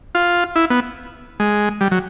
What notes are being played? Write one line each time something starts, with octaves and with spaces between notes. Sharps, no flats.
F4
E4
B3
G#3
G3
F#3